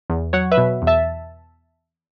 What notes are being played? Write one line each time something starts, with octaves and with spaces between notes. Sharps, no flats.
E2
F#3 C#5 F#5
B4 E5
B2
E2
E5 A5